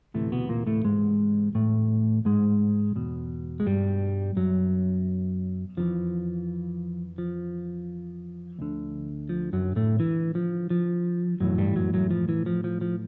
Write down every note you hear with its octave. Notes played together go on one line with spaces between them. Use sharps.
D2 A2 C3 E3 A3
B2 B3
A#2 A#3
A2 A3
G#2 G#3
A2 A3
G#2 G#3
E2 B2
G#3
G2 G3
F#2 F#3
F2 C#3 E3 F3
F3
D2 D3
F3
F#2 F#3
A2 A3
E3
F3
F3
B1 F#2 A2 E3 F#3
G2 G3
F#2 F#3
F#2 F#3
F3
E3
F3
F3
F3